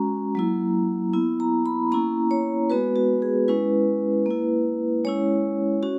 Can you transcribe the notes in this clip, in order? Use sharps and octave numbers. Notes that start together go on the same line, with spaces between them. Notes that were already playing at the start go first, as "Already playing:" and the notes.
Already playing: G#3 C#4 F#4 A#5
F#3 A#3 E4
B3 E4
A#5
B5
A#3 C#4 E4 A#5
C#5
G#3 B3 F#4 B4
F#4
G#4
G#3 C#4 E4 B4
A#3 E4
G#3 C#4 E4 C#5
C#4 F#4